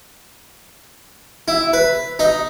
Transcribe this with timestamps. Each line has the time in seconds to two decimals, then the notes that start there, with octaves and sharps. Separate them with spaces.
1.48 E4
1.73 B4
2.19 D#4